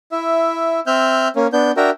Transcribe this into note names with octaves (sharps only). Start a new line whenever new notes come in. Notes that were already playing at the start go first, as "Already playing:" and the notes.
E4 E5
C4 E5 F6 G6
A#3 C#4
B3 D4 G6
D4 F#4 A#4 E5 G5 A#5